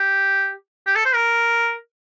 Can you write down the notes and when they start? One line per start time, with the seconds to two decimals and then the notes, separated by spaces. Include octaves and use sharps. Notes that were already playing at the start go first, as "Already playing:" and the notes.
Already playing: G4
0.87 G4
0.96 A4
1.05 C5
1.15 A#4